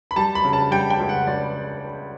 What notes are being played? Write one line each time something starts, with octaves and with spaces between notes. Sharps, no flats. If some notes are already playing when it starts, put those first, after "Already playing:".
B5
G3 A5
B5
C#3
A5
G3 G5
G5
C#2
F#5
C#2 D5